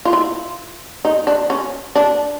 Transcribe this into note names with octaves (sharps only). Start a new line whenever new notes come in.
F4
E4
D#4
D4
C#4
D4